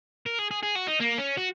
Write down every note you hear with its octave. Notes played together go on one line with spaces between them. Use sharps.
A#4
G#4
G#4
G#4
F#4
D#4
A#3
C#4
F#4